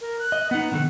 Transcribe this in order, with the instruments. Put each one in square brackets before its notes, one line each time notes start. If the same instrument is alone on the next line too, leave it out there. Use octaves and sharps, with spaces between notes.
[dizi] A#4
F#6
[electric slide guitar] D#5
[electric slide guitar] B3 D#4 [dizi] F#5
[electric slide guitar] D3 D#3 A4 [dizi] F#6